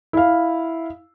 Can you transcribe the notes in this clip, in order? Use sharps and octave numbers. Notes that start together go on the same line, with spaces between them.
E4 F5